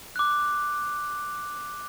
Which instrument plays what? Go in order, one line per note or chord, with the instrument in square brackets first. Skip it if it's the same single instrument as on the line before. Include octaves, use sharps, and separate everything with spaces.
[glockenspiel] D6 F#6